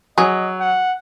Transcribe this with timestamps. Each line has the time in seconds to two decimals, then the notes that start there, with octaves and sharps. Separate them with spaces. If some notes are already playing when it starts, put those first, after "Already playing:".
0.18 F#3 G#4 D#5
0.60 F#5